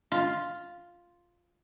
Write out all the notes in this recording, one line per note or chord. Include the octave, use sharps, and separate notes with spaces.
F4